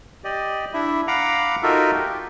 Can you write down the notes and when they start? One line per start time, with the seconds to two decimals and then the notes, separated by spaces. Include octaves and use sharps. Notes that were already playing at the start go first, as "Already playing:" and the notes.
0.24 G4 D5 D#5
0.74 D4 E4 E5
1.08 F5 F#5 A#5 B5 D6
1.63 D#4 F4 F#4 A4 A#4 E5
1.94 G4